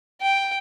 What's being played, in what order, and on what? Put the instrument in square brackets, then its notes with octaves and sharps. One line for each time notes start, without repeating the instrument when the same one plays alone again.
[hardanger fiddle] G5